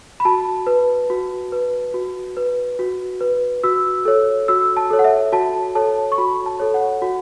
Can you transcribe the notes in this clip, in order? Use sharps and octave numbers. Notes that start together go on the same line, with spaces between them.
B5
F#4 A5
B4
F#4
B4
F#4
B4
F#4
B4
F#4 E6
A4 C#5
F#4 E6
A5
A4 C#5
F#5
E5
F#4 A5
A4 C#5 A5
C#6
F#4 B5
A5
A4 C#5
F#5
F#4